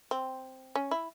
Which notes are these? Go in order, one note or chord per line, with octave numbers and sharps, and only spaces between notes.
C4
C#4
E4